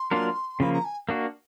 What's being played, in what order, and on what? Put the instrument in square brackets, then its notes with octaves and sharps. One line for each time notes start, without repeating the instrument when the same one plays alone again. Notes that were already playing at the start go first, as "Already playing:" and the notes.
Already playing: [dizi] C6
[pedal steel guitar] F#3 A#3 D4 F4 A#4
[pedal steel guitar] C#3 F3 A#3 [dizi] B5
[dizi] A#5
G#5
[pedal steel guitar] A#3 D4 F#4